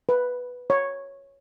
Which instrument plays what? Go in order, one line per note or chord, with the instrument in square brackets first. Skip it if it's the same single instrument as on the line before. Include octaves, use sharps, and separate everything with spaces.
[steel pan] B4
C#5